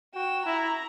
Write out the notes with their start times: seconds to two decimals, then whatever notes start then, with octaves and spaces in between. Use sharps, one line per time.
0.15 F#4 G5 E7
0.46 E4 A#5